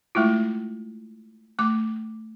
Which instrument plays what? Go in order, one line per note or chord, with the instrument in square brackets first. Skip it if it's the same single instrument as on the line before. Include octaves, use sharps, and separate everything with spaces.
[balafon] G#3 A3 E4 F4
A3 D6